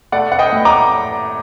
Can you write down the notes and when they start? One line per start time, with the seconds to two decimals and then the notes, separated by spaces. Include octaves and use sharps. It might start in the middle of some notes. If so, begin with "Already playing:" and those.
0.12 A3 D5 F#5
0.32 F#5
0.39 D#5 G5
0.52 A2
0.65 A#5 D6